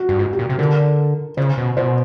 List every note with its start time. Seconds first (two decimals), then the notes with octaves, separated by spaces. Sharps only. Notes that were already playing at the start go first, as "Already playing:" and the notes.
Already playing: F#4
0.09 G2
0.19 G#2 F#4
0.33 G4
0.39 A#2
0.49 C3
0.59 D3 A#4
1.37 C#3 C5
1.58 B2
1.77 B2 C5